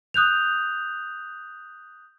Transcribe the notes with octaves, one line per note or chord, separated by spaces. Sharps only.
D#6 F#6 G6 F7